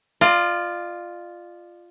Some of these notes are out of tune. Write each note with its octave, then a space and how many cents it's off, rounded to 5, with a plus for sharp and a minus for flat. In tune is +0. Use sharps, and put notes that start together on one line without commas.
F4 +0 D5 +40